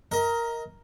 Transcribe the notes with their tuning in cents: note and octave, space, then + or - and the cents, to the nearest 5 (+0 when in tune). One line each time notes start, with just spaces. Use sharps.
A#4 +0 D#5 +30